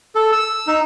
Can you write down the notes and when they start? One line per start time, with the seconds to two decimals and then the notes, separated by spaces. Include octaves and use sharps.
0.15 A4
0.32 E6
0.67 D#4